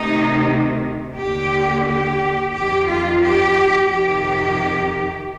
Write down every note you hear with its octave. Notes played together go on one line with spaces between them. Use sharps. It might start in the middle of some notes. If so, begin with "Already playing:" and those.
Already playing: D2 C3 D#3 D#4
D#2 D3 G4
G4
F2 D#3 G4
F4
G4
F2 C3 D#3 G4